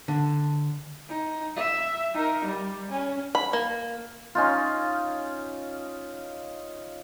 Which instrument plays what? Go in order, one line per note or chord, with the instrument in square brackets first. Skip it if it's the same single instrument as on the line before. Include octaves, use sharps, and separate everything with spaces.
[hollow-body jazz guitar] D3
[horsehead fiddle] D#4
E5
D#4 A#4
G3
C#4
[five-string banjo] B5
A#3
[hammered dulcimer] C#4 D#4 F4